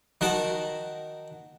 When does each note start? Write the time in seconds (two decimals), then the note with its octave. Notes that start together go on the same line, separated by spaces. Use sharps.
0.21 D#3 F#4 A#4 A5